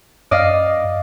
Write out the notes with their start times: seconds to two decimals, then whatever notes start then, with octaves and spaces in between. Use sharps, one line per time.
0.31 F#2 D5 D#5 F5